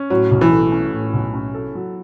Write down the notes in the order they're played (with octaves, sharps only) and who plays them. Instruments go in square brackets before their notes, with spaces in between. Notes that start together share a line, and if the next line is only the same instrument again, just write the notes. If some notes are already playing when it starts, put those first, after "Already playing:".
Already playing: [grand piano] C#4
[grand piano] A2 [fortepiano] F#3
[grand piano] B1
[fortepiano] E3
[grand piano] A3
C#4
A2
B1
C#4
A4
F#3